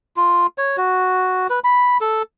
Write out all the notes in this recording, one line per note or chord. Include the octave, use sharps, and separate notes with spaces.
F4
C#5
F#4
B4
B5
A4